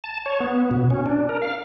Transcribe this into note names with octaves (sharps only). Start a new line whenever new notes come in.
A5
C#5
B3
B2
C#4
D4
A#4
F5